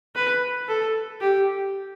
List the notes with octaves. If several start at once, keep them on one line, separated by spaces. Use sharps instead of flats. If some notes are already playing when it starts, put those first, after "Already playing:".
B4
A4
G4